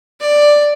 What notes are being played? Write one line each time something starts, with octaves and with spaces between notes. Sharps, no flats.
D5